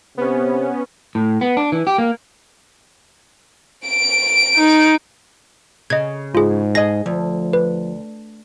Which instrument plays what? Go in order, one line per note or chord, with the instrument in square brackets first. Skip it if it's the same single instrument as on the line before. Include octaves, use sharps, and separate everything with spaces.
[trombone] C3 [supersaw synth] B3 C#4
[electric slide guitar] A2
B3
D4
E3
G4
A#3
[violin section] D7
[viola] D#4
[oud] C#3 [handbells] D#5 G#6
[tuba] G#2 [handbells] F4 G#4
[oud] G#4 D#5 [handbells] A#6
[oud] D2 [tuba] F3
[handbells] B4